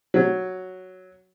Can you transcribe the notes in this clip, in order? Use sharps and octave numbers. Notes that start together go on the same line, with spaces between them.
F#3